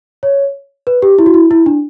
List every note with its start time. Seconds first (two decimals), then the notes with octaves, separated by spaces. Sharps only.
0.23 C#5
0.87 B4
1.02 G4
1.19 E4
1.26 F#4
1.34 E4
1.51 E4
1.66 D4